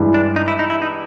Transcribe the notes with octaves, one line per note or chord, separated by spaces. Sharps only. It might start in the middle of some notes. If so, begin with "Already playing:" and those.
Already playing: G2 E3 G#3
D4
D#4
E4
D#4
E4
D#4